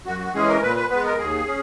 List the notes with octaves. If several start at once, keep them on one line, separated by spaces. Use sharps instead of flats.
F#2 F#4
F#4
E3 G#3 C#4 G#4
A#4
A#2 B4
B4
G#3 B3 B4
A#4
D#2 G#4
C#4